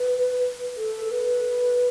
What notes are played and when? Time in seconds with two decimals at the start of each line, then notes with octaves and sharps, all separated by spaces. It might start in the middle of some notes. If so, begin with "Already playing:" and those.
Already playing: B4
0.77 A4
1.04 A4
1.11 B4